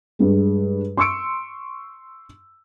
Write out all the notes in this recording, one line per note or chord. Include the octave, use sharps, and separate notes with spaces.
G2 G#3
C6 C#6 E6 C#7 D7